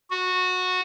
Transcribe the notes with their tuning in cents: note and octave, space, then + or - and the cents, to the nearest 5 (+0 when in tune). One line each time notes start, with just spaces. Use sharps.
F#4 -15